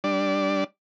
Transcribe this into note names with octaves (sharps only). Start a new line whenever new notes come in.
G3 D4 D5